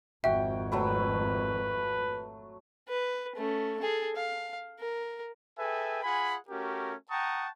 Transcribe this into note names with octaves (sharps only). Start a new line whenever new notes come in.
G#1 F2 F#4 E5 G5
F#3 A3 B4 B5
B4
A3 C#4
G#4 A4
F5
A#4
G#4 A4 B4 E5 G5 G#5
F4 G#4 F#5 G#5 B5
A3 C#4 F#4 G4 A#4
F#5 G5 A5 A#5 C#6 D#6